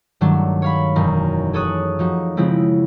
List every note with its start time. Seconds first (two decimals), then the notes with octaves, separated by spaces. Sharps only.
0.21 G2 D#3 F#3 A3 D4
0.62 C#5 F5 B5
0.96 E1 F#2 D#4 A#4
1.53 G#4 A4 C#5 D#6 F#6
1.99 F3 D#4 F#4
2.37 C#3 F3 G#3 C4 E4